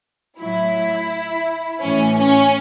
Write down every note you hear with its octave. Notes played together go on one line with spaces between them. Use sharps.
A2 F#3 E4
A2 E3 C#4
C#4